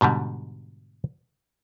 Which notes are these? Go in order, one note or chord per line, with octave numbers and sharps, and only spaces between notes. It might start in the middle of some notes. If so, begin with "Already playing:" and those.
G#2 B2 D3 G3